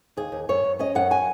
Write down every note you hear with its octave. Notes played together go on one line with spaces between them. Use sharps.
D#2 G#4
D#2
F#2 C#5
F#2
C#4 D#5
F#2 F#5
F#3 G#5